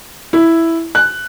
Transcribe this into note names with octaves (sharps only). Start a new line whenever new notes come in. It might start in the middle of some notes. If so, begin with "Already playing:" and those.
E4
F#6